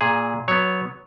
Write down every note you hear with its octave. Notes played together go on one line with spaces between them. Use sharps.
A#2 G#4
F#3 B3 C#5